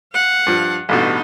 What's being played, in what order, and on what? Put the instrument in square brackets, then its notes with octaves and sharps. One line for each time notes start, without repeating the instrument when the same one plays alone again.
[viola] F5 F#5
[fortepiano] G2 F3
[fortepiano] A1 G2 B2 [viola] D#4